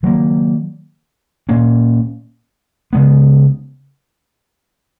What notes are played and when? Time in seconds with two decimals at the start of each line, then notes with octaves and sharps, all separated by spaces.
0.03 D#3 F#3 A#3
1.49 A#2 A#3 C#4
2.93 C#3 G#3 B3